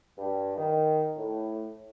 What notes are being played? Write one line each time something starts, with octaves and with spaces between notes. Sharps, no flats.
G2
D#3
A2